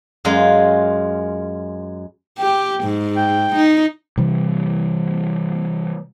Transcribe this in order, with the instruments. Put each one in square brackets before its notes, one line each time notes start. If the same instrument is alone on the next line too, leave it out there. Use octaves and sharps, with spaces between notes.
[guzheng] F#2 G#3 F4
[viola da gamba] G4 [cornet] G5
[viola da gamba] G#2
[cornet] G5
[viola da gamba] D#4
[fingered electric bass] C3 E3 G3